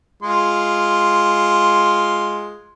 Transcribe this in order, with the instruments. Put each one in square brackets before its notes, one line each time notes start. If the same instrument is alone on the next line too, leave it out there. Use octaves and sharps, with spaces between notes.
[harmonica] G#3 F4 C6